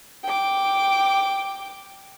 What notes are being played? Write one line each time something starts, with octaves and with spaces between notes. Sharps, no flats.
G5 D6